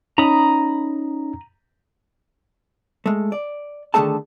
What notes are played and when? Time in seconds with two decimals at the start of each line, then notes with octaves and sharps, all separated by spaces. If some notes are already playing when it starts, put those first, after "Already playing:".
0.18 C#4 D#4 A#5 B5 D#6
3.06 G#3 A3
3.32 D5
3.94 D3 D#3 A3 G#4 A4 A5